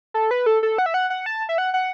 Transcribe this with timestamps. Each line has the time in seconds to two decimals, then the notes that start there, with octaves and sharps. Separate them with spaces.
0.14 A4
0.31 B4
0.46 A4
0.63 A4
0.78 F#5
0.86 E5
0.94 F#5
1.10 F#5
1.26 A5
1.49 E5
1.58 F#5
1.74 F#5